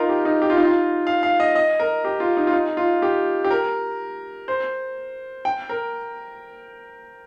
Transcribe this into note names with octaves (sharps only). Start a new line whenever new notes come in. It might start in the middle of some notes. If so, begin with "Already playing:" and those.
Already playing: D#4 F4 A#4
G4
D#4
G4
F4
D#4
F4
F5
F5
D#5
D#5
A#4
G4
F4
D#4
F4
D#4
F4
G4
G4
A#4
C5
G5
A#4